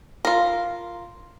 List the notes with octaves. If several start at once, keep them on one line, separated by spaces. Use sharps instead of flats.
F4 A#4